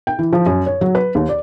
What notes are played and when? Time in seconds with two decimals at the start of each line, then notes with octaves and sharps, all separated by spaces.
0.07 G5
0.19 E3
0.33 F3
0.46 F#2
0.66 C#5
0.81 F#3
0.95 B4
1.15 D#2
1.29 D5